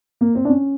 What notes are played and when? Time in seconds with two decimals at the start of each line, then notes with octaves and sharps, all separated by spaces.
0.21 A#3
0.35 C4
0.45 D4
0.49 C#4